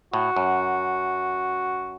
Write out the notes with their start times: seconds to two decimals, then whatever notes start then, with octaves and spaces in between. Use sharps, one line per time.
0.13 A2 F#4
0.36 F#2